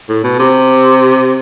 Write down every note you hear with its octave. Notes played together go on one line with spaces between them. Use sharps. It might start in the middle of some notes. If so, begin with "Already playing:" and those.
A2
B2
C3